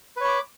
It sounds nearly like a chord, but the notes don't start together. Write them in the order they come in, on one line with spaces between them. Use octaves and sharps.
B4 C#5 B5 D6